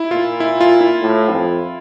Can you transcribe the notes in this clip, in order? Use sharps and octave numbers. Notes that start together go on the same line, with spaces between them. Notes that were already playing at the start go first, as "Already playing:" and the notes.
Already playing: E4
A#2 F4
E4
F4
E4
A2
F2